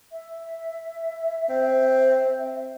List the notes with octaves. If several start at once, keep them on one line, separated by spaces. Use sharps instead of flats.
E5
C4